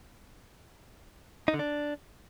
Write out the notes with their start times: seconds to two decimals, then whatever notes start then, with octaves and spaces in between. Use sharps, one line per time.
1.48 D#4
1.54 D3
1.59 D4